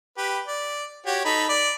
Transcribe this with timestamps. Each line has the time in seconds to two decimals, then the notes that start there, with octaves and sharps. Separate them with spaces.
0.18 G4 B4
0.47 D5
1.06 F#4 G4 C#5
1.25 D#4 A4 B5
1.49 D5